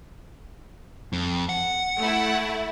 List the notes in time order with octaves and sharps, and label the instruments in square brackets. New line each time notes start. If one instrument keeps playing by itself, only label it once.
[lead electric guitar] F2
F#5
[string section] A3 E4